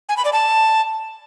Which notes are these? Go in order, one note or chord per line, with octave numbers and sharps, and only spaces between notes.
G#5
B5
D5
A5